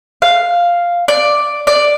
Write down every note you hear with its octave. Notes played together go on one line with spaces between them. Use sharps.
F5
D5
D5